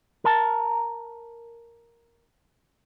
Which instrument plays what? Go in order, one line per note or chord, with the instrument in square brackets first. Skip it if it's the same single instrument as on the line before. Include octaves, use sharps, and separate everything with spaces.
[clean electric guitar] A#4 A5